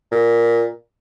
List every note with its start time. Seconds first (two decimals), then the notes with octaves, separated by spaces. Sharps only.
0.11 A#2